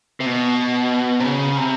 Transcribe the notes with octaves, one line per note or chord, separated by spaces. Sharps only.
C3
B2
C3
C#3
C3